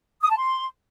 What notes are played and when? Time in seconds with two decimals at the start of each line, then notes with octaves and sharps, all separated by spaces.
0.22 D#6
0.30 A5
0.38 C6